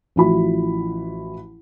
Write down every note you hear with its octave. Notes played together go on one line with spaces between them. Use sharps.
A1 F3 E4 F#4 B5